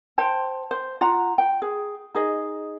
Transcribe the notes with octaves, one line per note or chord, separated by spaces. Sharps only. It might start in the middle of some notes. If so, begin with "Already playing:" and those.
C5 G5 A5
C5
F4 F#5 A#5
G5
G#4
D#4 G#4 D#5